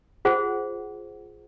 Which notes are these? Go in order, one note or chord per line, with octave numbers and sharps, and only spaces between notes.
F4 G#4 C5 F#5